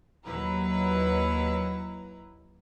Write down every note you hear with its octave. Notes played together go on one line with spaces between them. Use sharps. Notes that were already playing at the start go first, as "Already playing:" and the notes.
D#2 F#3 E4 B4 A#5